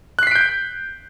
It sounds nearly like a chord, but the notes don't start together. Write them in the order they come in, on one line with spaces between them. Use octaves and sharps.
F#6 C7 B6 D7 G6